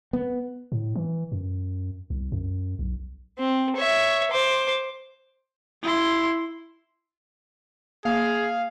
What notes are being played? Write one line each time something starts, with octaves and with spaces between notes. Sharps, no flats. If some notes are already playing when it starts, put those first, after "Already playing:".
B3
A2
E3
F#2
C2
F#2
B1
C4
C#5 E5
C5 D6
E4 C6
A#3 G#4 F5